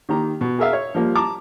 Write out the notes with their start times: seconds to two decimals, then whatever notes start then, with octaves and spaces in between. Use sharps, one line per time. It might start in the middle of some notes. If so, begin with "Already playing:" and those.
0.09 D#3 A#3 G4 A#5
0.41 B2
0.58 G#4 A#4 E5 F5
0.73 C#5
0.95 F3 G3 A#3
1.15 A5 A#5 D6